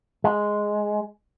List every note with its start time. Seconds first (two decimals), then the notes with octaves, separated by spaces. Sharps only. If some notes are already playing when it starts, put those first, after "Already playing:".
0.24 G#3